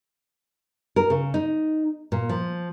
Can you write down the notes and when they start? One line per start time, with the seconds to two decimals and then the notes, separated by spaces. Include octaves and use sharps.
0.96 A#4
1.10 C#3
1.34 D#4
2.12 A#2
2.29 F3